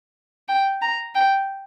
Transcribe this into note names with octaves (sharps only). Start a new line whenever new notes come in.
G5
A#5
G5